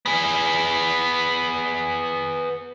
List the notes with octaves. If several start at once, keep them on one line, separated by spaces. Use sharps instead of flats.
B3 G#4